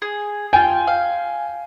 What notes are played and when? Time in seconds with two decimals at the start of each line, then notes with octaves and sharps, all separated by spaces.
0.02 G#4
0.53 F4 G5 G#5
0.87 F5